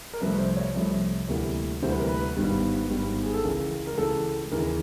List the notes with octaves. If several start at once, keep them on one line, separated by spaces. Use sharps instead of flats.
A#4
C2 C3 F3 A3 B4
C5
C#5
C2 C3 F3 A3
D2 C3 E3 G3 A#3
D2 C3 E3 G3 A#3 C5
B4
A#4
B4
G#1 G2 D#3 G3 B3
G#1 G2 D#3 G3 B3
G#4
A4
C#2 C#3 E3 A#4
A#4
C#2 C#3 E3 A4
D#2 C#3 E3 A#4